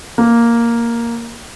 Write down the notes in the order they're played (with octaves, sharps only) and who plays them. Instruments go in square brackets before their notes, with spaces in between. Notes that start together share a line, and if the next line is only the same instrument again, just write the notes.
[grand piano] A#3